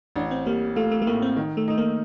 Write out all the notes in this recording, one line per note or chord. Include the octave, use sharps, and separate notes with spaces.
A1 D4
C4
G3 A#3
A3 F4
A3
A3
A2 A#3
C4
D#3
A3
A3 D#4
A#3